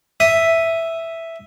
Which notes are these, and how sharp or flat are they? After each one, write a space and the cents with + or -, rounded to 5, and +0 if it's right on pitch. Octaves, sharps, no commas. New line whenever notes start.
E5 +0 D#6 +0